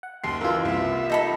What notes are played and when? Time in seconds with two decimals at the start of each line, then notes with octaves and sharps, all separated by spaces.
0.03 F#5
0.24 F#1 D#2 C6 C7
0.41 F#1 E3 A#3 F4 E6
0.65 C2 E5
1.10 D#4 A4 B5